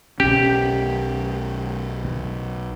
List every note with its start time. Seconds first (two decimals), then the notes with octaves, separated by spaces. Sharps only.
0.20 B1 C#4 G4